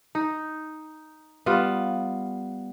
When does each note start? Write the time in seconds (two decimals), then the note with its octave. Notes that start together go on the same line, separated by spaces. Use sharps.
0.15 D#4
1.46 G3 B3 F4